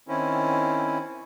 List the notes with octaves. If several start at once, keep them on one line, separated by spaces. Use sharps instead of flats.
D#3 C4 C#4 E4